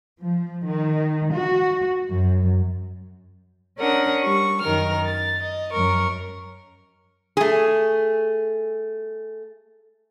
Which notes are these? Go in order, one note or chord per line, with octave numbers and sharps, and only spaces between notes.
F3
D#3
F#4
F#2
C#4 D4 A#4 F#5 D#6
G3 C#6
F#2 D#3 A#4 F6
A6
D#5
F#2 A#4 C#6
A3 G#4